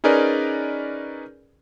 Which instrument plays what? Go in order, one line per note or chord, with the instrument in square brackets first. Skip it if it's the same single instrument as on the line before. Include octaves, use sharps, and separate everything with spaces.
[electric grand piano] C#4 D#4 G#4 A#4 B4 D5